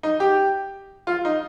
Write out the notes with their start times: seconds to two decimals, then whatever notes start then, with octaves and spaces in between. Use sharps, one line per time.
0.03 D#4
0.20 G4
1.07 F4
1.25 D#4